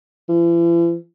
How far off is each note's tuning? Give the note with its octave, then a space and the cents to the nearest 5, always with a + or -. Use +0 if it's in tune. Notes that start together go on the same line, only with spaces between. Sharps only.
E3 +45